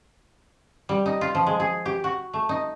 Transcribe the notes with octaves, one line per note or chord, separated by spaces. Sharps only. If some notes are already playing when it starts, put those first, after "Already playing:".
G3
D#4
F4
F3
G#3
G#4
G4
F#4
A3
D#4